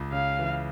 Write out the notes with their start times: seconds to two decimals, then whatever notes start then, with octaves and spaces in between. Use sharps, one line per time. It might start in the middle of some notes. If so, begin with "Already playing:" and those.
Already playing: C#2
0.12 C#3 F5
0.39 E3